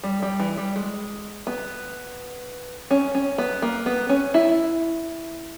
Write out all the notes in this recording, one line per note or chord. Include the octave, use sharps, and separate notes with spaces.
G3
G3
E3
G3
G#3
B3
C#4
C#4
B3
A#3
B3
C#4
E4